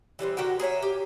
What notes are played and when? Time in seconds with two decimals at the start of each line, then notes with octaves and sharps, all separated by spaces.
0.19 E3 G3 G#3 C4
0.37 D3 F#4 A#4 G5
0.60 G#4 A#4 C#5 E5
0.82 G4